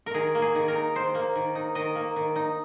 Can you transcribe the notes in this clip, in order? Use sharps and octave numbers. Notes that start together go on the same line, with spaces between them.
A#4
D#3 G#4
A#3
G#4
D#3
A#4
D#4
D#3 C5
A#3
D#3
D#4
D#3 D#5
A#3
D#3
D#4